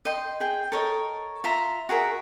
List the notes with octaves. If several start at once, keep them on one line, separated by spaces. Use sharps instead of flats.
D#5 G5 C6
G#4 G5
A4 A#4 C#5 D#5
F4 E5 A#5 C6
F#4 G#4 A#4 E5